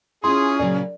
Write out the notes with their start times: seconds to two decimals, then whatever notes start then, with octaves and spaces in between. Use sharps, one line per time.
0.24 C#4 E4 F4 G#4 C6
0.59 A#2 C#3 F#3 D5